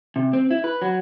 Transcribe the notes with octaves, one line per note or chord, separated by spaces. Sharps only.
C3
C4
E4
B4
F#3